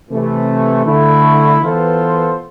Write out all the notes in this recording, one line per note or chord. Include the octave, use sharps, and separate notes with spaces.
C3 E3 A3
D3 A3 E4
E3 B3 F4 A4 C5